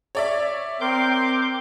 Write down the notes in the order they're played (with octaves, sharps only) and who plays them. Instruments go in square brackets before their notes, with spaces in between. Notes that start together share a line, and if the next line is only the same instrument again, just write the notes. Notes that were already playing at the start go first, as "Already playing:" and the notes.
[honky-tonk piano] C#5 D5 E5
[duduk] C4 [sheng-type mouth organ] A#4 [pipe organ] C6 D6 G6